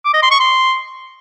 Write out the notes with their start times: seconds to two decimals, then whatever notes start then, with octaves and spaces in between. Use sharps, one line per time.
0.05 D6
0.14 D#5
0.23 C6
0.31 C#6
0.40 C6